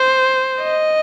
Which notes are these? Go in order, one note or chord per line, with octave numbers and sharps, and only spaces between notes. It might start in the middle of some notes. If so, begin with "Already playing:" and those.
Already playing: C5
D#5